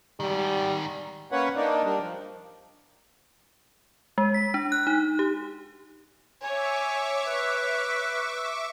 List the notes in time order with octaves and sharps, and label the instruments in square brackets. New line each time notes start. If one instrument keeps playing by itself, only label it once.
[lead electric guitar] G#2 D#3 [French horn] G3
[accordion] A#3 C#4 B4 C#5 F#5
A#3 D4 D#4
G3 A#3 D4
F3
[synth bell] G#3
B6
D4
F#6
D#4
G4
[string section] C#5 [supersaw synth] E5 C#6 D6 [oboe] G#5
[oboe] B4